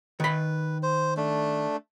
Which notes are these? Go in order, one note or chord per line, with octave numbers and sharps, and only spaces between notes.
D#3 B4 B5
C5
A3 D4